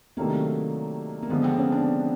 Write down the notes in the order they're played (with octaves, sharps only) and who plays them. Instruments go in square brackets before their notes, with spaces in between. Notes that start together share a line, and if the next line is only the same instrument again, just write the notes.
[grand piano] C3 D#3 F#3 A3 D4 [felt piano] A#3
[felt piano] A#3
[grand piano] D3 F3 G#3 [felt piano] B3
[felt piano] C4
C#4
D4